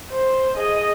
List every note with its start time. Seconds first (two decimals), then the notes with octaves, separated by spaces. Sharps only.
0.11 C5
0.55 G#4 D#5